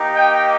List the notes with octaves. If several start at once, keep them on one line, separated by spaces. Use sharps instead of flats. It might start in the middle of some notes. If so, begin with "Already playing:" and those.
Already playing: A#3 D#4 G4
D#5 G5